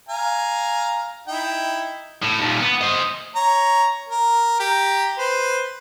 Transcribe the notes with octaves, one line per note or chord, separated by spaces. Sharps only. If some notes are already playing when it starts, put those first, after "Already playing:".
F5 G#5 A#5
D#4 E4 G5
A2
D#2 A#2
B3
C5 D#5
C#5 A#5
A#4
G4 A#5
B4 C5